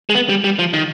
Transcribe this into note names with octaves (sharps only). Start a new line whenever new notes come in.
G#3
B3
G3
G3
F3
D#3